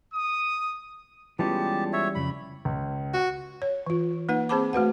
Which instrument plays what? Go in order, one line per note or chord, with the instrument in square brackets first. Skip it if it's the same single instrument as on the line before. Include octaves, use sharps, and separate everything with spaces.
[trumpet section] D#6
[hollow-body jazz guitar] E3 G3 C#4 [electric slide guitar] G#3 B3 F4 [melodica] G4 A5
[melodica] C#5 E5
[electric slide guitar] F2 C#3 [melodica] B5
[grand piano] C#2
[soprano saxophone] F#4
[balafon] C#5
E3 F4
A#3 D#4 B4 F#5
C4 G#4 C5 A5 B5 D6
A3 F#4 B4 F#5